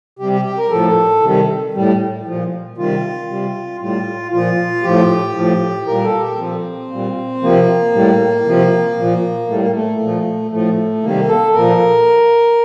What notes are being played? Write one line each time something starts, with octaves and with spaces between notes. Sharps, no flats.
C3 G3 G4
G4
G4
A#4
A2 F3 A4
C3 D#3 G3
A2 G3
A#2 F3
C3 D#3 G3 F4
C3 G3
A2 G3 F4
A#2 F3 F4
A2 F3 G4
A2 F3
A#2 G3 A#4
A4
G4
A#2 F3 C4
A#2 G3
C3 F3 A#3
A2 G3
C3 F3
A#2 F3
A2 G3 A3
A#3
A3
A#2 F3
A2 F3 A3
C3 D#3 G3 A#3
A4
A#2 F3 A#4